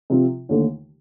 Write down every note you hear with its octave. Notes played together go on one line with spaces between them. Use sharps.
C3 F3 C4
D#2 D3 A3